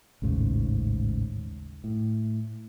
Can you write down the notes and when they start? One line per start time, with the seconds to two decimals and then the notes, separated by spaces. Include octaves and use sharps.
0.22 A1 D#2 G#2 C#3
1.84 A2